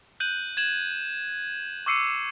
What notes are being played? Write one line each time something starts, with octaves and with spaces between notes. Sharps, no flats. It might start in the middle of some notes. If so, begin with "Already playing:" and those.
F#6 G6 D#7 F#7
G#6 E7 F#7
C#6 D6 E6 C7 C#7 D#7